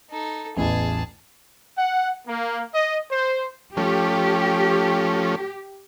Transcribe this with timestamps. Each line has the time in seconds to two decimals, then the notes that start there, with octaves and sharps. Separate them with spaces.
0.10 D#4 A4
0.57 A1 E2 E4 G#4 A5
1.78 F#5
2.27 A#3
2.73 D#5
3.10 C5
3.77 F3 A3 C#4 G4